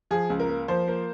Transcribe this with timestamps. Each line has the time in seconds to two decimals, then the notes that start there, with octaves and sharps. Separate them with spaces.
0.11 F3 G#4
0.30 C#2
0.40 A#4
0.49 A#3
0.68 F3 C5
0.88 A#3